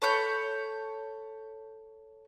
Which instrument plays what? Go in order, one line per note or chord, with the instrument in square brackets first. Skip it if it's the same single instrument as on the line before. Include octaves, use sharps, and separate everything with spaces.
[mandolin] A4 C#5 B5 G6